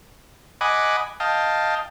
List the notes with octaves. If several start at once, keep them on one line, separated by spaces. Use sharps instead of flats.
D#5 F#5 G#5 B5 D6
D#5 F5 G5 A5